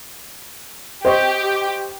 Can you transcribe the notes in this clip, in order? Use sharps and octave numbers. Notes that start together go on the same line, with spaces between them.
G4 C5 D#5 C#6